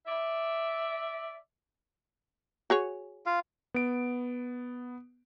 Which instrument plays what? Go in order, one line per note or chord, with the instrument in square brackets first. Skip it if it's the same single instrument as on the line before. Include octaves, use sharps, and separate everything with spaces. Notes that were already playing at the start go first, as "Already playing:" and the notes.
[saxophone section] D5 E5
[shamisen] F#4 G#4 C#5
[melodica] F4 F5
[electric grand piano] B3 D7